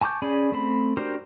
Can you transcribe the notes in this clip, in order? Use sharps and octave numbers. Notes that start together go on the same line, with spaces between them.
G#5 A5 C#6 D6 G6
C#4 G#4 D5 G#5 B5
A3 C4 B5
D4 F#4 G4 A#4 C5